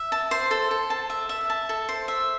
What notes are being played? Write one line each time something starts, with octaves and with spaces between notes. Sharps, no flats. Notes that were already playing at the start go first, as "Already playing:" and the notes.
Already playing: E5
A5
C5
A4
A4
A5
E5
E5
A5
A4
C5
E5